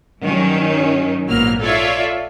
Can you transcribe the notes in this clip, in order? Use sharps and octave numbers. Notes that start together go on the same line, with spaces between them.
G2 D#3 F#3 C#4
A#1 G#2 F#3 A#3 B3 F6
F4 A4 C#5 D5 E5